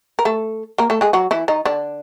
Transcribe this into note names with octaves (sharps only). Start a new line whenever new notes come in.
A#4
A3 A4
A#3 A#4
A3 A4
G#3 G#4
F#3 F#4
E3 E4
D#3 D#4
D3 D4